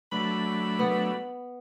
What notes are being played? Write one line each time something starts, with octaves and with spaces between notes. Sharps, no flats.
F#3 A3 D4 B5
B3